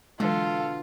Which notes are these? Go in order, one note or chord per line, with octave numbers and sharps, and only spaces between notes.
B2 D3 E3 F#3 G#3 F4 A4 F5